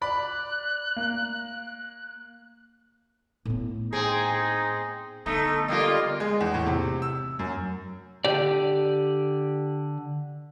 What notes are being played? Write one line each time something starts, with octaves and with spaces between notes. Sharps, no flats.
D5 B5 F#6
A#3
A2 B3
C4 D#4 G#4
D3 A3 B3 D#4
G3 A#3 F4 D#5
G#3
E2
A2
C3
E6
F#2
D3 G4 D5